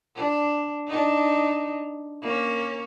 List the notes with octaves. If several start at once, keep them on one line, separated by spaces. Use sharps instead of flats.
D4
D4 D#4
A#3 C#4